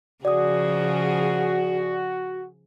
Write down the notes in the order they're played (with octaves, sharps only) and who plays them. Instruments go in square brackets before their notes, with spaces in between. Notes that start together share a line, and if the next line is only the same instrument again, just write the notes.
[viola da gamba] C#3 F3 G#4 [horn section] F#4 [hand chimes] D5 D#6